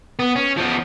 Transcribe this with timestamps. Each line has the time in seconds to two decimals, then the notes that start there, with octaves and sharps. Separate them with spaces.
0.19 B3
0.36 C#4
0.57 F3 B3